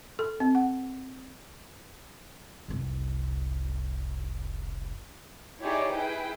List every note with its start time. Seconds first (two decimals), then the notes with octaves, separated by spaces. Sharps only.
0.19 A4
0.40 C4
0.55 F#5
2.68 F1 C2
5.62 D#4 E4 G4 G#4 C#5 D5
5.92 E4 G#4 B4 G5